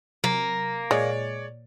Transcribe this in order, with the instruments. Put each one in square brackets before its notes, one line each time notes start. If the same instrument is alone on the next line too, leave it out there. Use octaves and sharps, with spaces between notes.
[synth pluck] C3 F#3 [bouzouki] A#3
[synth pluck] A#2 [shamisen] G#3 [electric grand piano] C#5 D5